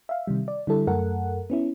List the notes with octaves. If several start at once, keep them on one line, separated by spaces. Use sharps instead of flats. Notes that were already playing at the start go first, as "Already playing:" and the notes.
E5 F5
C3 D#3 G3
D5
D3 G3 E4 A4
F#2 A3 A4 A#4 F#5
B3 C#4 E4